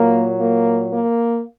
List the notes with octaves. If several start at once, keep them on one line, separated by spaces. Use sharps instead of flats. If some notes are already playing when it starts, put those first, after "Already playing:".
Already playing: A#2 F#3 A#3
A#3
A#3